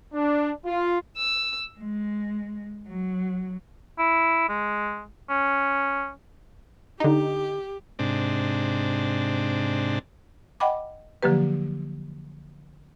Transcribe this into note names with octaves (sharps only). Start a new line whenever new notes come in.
D4
F4
E6
G#3
F#3
E4
G#3
C#4
D3 D#4 G4
G#2 C3 D4
D#5 F#5 G5 B5 D6
D3 F3 F#3 A#3 G4 B4